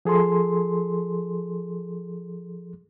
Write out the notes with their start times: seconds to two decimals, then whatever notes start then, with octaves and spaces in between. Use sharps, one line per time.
0.05 F3 G#4 A4 C6